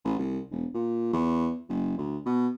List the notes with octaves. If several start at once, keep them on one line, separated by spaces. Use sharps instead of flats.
A1
C2
E1
A#2
E2
F#1
D2
B2